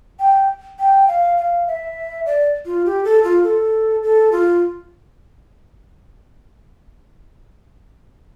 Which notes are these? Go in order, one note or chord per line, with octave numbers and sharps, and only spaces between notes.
G5
G5
F5
F5
E5
D5
F4
G4
A4
F4
A4
A4
F4